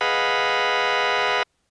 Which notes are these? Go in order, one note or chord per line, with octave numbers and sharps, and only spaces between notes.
G#4 B4 D#5 F5 F#5 B5